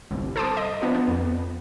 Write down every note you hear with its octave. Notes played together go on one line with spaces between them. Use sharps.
G1 C2
A4 C5 A5 C6 D6 D#6
D#5
F3 B3 D4
B3
F2